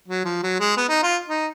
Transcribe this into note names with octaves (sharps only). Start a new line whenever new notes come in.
F#3
F3
F#3
G#3
B3
D#4
F4
D#4